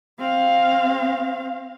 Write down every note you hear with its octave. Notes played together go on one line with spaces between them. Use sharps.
C4 F5